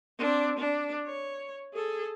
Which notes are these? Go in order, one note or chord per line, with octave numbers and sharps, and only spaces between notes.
C4 D4
D4
C#5
G#4 A4